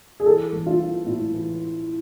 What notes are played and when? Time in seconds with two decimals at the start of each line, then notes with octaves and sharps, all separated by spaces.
0.20 G#4
0.26 E3 A4
0.52 A1
0.66 F4
0.80 E3
1.06 A2
1.34 E3